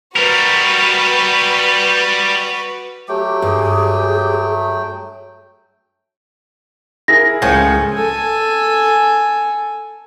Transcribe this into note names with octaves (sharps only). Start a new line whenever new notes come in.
G3 F#4 A#4 B4
F#3 A3 G4 G5
G2 G#4
E4 G#4 A#4 A#6
C#2 A2 F3 G#3 C#4
A4 G#5